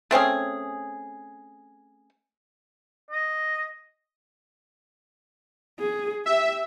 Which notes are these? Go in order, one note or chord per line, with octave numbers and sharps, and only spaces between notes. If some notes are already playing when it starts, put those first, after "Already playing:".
A3 C4 C#4 G#4
D#5
G#4
G4 E5